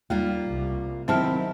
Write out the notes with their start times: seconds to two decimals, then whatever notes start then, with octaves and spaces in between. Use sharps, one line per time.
0.10 D#2 G3 A#3 F4
0.47 C2
1.08 D#3 F#3 C4 E4 G4 A5 F6